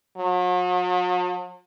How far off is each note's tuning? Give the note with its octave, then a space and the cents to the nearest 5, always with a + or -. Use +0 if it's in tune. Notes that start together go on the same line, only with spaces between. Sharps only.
F#3 -45